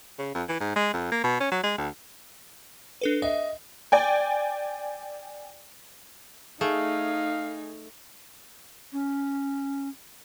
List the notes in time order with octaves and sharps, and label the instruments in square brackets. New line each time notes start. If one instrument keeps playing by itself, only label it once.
[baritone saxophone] C#3
F2
E3
G#2
G#3
F2
A#3
B2
C#4
F#3
G#3
D2
[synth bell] D4 A4 B4
[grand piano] D#5 [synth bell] E5
[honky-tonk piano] D5 G5 G#5
[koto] A3 [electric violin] D#4 [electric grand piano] G#4 [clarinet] F5
[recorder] C#4